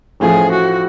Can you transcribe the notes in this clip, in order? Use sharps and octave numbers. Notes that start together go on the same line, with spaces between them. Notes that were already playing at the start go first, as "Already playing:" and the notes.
A1 A2 F3 G#4
F#4